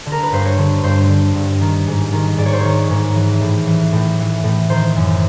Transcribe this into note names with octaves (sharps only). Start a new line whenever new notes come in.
D3
A#4
B4
G2 C5
C#5
D3
G2 C5
D3
G2
D#3
G#2
D#3
G#2 D5
C#5
C5
D#3 C#5
G#2
E3
A2
E3
A2
E3
A2
D#3 C5
F#2